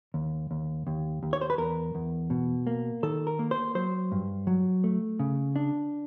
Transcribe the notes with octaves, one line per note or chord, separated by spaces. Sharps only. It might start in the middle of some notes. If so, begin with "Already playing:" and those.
D#2
D#2
D#2
D#2
C#5
C5
B4
E2 A#4
E2
B2
A#3
D#3 A4
A#4
A#3
C5
F#3 C5
G2
F#3
A3
C#3
D4